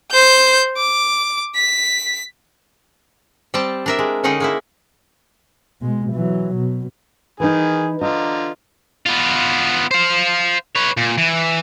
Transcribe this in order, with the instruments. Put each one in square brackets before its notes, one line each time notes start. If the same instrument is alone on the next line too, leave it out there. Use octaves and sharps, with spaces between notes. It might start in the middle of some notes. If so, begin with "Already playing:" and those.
[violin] C5 G6
D6
B6
[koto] G3 C4 G5 A5
D4 A#4 E5
G#3
D3 C#4 D#4 G#4 F#5 G5
G#3 A#3 E4
[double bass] B2 G#3
E3 F#3
B2
[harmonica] D#3 G#4 [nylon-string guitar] E3 D#4
[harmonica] D3 F4 A#5 [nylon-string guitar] D#5
[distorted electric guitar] B3 F4
C5 F5
B4 C#5
A#2
E3